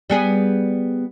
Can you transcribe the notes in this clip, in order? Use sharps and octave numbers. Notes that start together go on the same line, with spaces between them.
G3 B3 G#4